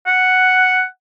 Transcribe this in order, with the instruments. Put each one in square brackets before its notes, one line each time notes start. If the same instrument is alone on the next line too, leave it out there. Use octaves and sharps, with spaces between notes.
[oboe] F#5